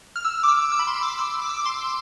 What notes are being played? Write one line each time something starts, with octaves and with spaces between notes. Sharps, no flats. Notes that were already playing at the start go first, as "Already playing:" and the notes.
F6
E6
D6
E6
E6
B5
C6
D6
E6
D6
E6
D6
C6